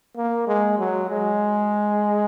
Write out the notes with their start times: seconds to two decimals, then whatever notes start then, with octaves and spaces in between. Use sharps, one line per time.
0.17 A#3
0.47 G#3
0.78 F#3
1.09 G#3